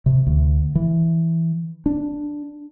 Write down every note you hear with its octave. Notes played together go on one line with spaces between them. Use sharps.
C3
D2
E3
D4